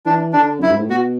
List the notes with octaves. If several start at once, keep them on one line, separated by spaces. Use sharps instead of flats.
E3 D4
D3 D4
F#2 E4
G#2
A2
B2 F#4